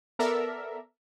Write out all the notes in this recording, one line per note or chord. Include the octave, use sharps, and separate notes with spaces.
B3 A4 A#4 D5 E5